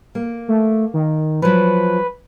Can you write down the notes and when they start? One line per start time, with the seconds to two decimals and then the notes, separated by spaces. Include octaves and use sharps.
0.15 A#3
0.48 A3
0.94 D#3
1.42 F3 F#3 B4